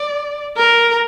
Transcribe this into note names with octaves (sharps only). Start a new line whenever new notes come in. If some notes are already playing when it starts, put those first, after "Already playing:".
Already playing: D5
A#4